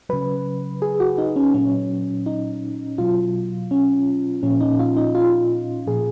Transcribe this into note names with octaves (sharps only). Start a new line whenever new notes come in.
C#3 F#3 B4
G#4
F#4
D#4
C#4
A#2 F#3 C#4
D#4
B2 F#3 F4
C#4
A#2 F3 C#4
D#4
F4
D#4
F4
A#2 F3 G#4